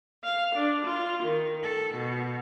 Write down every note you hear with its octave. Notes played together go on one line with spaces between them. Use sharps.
F5
D4
F4
D#3
A4
B2